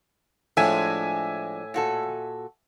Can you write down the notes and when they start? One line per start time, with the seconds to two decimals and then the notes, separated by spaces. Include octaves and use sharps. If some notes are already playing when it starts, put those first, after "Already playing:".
0.57 A2 F3 G#3 D4 E5 G#5
1.74 A#2 F#4 A4